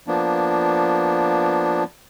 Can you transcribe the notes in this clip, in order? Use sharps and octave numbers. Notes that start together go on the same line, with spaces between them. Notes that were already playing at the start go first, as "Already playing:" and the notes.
F3 A#3 B3 D4